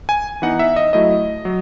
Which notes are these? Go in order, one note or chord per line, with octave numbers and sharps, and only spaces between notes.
G#5
E3 B3 D#4 F#5
E5
D#5
F#3 A3 E4 D#5
F#3